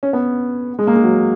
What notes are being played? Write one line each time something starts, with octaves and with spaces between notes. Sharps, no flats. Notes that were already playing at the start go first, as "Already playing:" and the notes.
C#4
B3
G#3
A#3
G#3
F#3